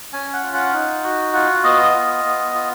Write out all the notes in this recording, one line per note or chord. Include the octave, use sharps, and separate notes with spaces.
C#4 G#5
F#5
F4
F#5
D#4
F#4
F4 F#5
B3 D#5
F4
B3
F4